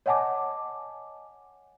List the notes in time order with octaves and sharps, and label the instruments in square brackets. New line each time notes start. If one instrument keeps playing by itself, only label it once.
[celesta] C#5 D#5 F#5 G#5 A5 D6